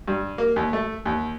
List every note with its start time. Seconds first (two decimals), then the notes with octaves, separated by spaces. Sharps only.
0.08 G2
0.38 A#3
0.56 D#2
0.73 A3
1.05 D#2